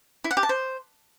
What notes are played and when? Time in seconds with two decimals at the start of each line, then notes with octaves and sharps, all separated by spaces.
0.24 E4
0.31 F#5
0.37 G4
0.43 A5
0.49 C5